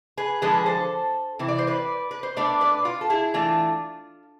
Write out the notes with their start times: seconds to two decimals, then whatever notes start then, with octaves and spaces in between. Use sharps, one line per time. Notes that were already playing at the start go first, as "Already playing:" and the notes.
0.17 G#4 B4
0.42 D3 F3 G#3 G#4 B4
0.66 A4 C5
1.39 C3 E3
1.48 D5
1.59 C5
1.67 B4 D5
2.11 B4
2.23 C5
2.37 B2 A3 D4 B4 D5
2.61 B4 D5
2.85 F4
3.01 A4
3.10 E4 G#4
3.34 E3 A3 D4 F4